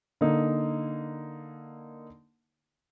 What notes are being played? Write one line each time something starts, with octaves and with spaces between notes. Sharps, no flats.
D3 A#3 D#4